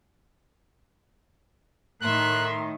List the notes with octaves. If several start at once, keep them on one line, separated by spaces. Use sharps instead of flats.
A2 D#3 A#4 E5 C6 F#6